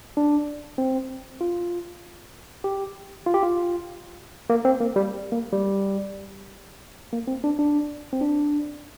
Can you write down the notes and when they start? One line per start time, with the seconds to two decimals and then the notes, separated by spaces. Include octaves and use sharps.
0.17 D4
0.78 C4
1.41 F4
2.64 G4
3.26 F4
3.34 G4
3.43 F4
4.50 A#3
4.65 C4
4.81 A#3
4.96 G3
5.32 A#3
5.53 G3
7.13 A#3
7.27 C4
7.44 D4
7.59 D4
8.13 C4
8.21 D4